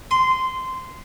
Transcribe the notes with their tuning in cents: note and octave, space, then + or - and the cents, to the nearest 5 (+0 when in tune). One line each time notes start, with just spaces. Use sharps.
C6 -15